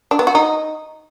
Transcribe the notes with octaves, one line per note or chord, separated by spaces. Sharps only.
D4
B3
F#4
D#4